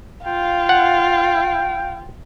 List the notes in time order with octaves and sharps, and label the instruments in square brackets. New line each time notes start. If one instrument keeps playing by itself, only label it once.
[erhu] F4 [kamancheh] F5 [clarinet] G5
[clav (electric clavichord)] F#5